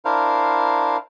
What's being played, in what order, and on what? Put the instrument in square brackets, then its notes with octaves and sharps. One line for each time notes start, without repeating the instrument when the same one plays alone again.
[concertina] D4 E4 A#4 C5 F5